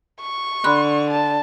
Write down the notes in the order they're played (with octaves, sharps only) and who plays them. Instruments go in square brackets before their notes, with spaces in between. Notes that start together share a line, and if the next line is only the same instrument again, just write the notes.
[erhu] C#6
[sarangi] D3 [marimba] B5 C6 F#6
[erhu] A5